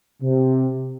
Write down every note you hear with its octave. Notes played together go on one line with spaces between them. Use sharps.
C3